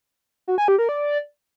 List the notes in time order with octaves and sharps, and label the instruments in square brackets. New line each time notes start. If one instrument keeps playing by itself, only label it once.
[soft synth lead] F#4
G#5
G4
A#4
D5